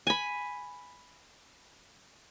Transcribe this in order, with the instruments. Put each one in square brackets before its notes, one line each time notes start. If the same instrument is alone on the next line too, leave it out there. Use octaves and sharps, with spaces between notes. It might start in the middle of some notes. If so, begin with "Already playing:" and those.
[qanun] G#5 B5